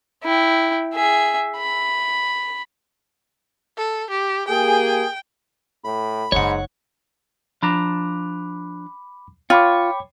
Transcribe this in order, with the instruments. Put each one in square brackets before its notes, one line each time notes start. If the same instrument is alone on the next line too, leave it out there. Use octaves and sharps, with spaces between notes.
[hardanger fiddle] E4 G5
G#4 E5
B5
[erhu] A4
G4
[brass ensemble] A#3 G4 G#4 [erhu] G5
[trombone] A2 [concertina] B5
[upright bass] F#1 D#4 [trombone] G#2 [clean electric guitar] C#5 F#5
[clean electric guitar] F3 D4 A#5 [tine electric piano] B5 D6
[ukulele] F4 [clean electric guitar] C#5 [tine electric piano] G5 B5 D6